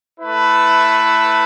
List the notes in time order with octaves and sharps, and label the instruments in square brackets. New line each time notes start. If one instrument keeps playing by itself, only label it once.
[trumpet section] A3 E4 B4